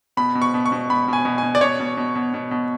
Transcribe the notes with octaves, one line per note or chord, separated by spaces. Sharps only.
B2 B5
B2
C#6
B2
C#6
B2
B2 B5
B2 G#5
B2
B2 G#5
D5
B2 C#5
B2
B2
B2
B2
B2